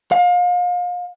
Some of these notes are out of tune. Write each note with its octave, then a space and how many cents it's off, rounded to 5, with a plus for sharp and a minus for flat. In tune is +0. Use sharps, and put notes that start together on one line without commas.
F5 +35